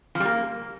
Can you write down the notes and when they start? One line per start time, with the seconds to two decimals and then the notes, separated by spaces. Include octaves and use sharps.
0.15 F3
0.20 G3
0.25 A#3